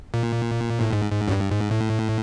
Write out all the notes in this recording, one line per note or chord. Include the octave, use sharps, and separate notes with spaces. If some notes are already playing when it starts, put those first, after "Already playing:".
A#2
A2
G#2
G#2
F#2
G2
G#2
A2